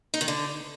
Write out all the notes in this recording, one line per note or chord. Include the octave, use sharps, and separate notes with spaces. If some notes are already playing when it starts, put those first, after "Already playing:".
D#4
D#3
D3